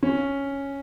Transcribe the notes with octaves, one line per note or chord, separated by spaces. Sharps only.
C#4